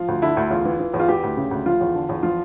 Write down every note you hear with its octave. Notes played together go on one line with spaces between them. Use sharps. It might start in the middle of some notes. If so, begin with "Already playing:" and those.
Already playing: F3 F4
D2
D3 E4
D2
E2 F4
E3
E3
E2
F4
E3 G4
D2
C#3
D2
F3 F4
E2
D3
E2
F3 F4